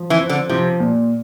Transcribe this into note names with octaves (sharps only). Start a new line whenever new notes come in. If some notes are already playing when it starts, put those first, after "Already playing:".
Already playing: F3
E3
C4
D3
C3 F3
A#2